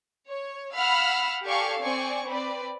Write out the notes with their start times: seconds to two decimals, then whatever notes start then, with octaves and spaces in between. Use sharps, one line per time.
0.28 C#5
0.76 F5 F#5 B5 E6 F6
1.46 G4 A4 D5 F5 G#5 C#6
1.80 C4 D5 G#5 C#6
2.26 C4 B4 D5